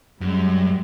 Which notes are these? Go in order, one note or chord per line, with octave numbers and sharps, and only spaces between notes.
F#2 G3 G#3